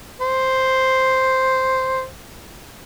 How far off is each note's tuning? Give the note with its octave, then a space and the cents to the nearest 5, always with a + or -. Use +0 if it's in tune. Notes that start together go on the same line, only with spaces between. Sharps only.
C5 +0